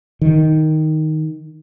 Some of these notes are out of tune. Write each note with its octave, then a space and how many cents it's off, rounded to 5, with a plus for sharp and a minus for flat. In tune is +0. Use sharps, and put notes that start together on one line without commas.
D#3 +5